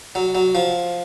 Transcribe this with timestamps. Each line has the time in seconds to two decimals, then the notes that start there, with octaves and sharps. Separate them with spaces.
0.15 F#3
0.35 F#3
0.55 F3